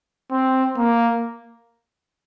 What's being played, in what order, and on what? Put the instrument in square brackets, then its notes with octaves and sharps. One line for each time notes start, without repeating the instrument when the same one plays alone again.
[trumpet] C4
A#3